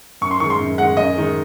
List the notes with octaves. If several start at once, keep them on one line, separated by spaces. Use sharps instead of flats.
F#2 C#6
C6
D#3 G#3 C#6
C6
F#2
D#3 G#3 F#5
F#2 D#5
D#3 G#3